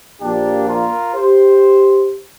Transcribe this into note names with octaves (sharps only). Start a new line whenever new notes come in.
A#1 A#2 F3 A#3 D4 G4
F4 A#4
G4 C5